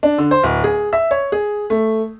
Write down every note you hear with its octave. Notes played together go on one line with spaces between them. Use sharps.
D4
D3
C5
D1
G#4
E5
C#5
G#4
A3